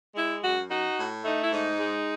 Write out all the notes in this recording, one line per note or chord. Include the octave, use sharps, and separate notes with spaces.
G#3 E4
F#2 F#4
D#4 F#4
A2
A3 D#4
E4
G#2 D#4
G#3